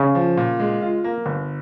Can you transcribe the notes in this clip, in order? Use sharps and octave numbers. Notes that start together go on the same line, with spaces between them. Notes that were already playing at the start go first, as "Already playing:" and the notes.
Already playing: C#3
F3
A#2
G#3
F4
A#3
G1